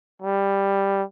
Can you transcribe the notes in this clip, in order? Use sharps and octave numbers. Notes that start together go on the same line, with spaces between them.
G3